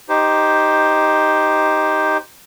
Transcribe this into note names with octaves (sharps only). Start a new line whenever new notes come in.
D#4 G4 C5